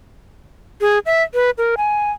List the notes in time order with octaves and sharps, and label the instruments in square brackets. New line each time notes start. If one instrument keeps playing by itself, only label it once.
[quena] G#4
E5
B4
A#4
G#5